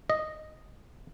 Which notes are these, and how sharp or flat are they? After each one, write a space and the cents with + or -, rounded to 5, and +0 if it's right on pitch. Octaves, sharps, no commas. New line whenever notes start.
D#5 -5